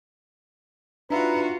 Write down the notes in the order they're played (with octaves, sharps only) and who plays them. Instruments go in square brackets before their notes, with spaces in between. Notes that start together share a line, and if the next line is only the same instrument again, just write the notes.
[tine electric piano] D4 D#4 E5 [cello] F4 F#4 [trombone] B4 [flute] A#5